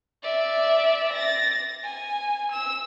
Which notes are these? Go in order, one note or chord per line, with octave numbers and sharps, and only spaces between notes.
D5 E5
A6 A#6
G#5
E6 E7